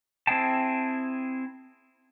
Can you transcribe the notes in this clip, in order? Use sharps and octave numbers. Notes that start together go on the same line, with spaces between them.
C4 E4 G#4 G5 A5